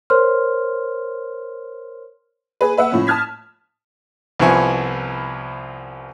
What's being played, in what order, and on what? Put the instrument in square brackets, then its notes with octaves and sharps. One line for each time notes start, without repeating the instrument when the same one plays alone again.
[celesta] A#4 C5 C#5 C6 F6
[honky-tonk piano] G#4 B4
B4 E5 F#5
A2 F3 C#4
A5 D#6 F6 G#6 B6
[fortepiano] C2 F3 B3 E4 G#5 C#6